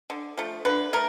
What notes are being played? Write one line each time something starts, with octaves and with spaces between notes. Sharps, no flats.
D3
F3 A3
D3 B4
A3 A#4